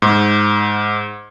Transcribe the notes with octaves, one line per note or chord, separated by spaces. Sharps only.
G#2